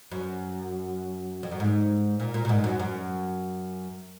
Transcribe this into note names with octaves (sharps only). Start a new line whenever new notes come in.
F#2
F2
F#2
G#2
A#2
A#2
A#2
G#2
F#2
F#2